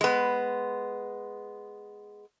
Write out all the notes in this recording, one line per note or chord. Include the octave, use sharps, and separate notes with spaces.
G#3 B3